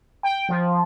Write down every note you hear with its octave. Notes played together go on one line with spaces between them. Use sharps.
G5
F3